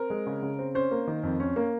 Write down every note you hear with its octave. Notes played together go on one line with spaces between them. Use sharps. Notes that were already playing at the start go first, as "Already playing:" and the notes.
Already playing: C4 A#4
G#3
C#3
C#3
C4
C#4 C5
A#3
D#3
F2
C#4
A#3